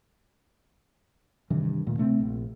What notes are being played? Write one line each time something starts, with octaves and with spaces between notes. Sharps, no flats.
G2 C3 D#3 E3
D2 A#2
C3 A3 B3 C4
A#1